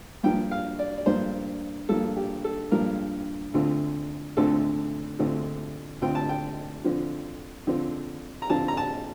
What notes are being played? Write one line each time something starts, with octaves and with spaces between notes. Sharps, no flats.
G2 F3 A#3 G5
F5
D5
D5
G2 F3 A#3 C5
G2 F3 A#3 A4
G4
A4
G2 F3 A#3 A#4
D2 D3 A3 C4 F4
D2 D3 A3 C4 F4 A4
D2 D3 A3 C4 F4
D2 D3 A3 C4 F4 G5
A5
G5
D3 F3 C4 F4
D3 F3 C4 F4
A#5
D3 F3 C4 F4 A5
A#5
A5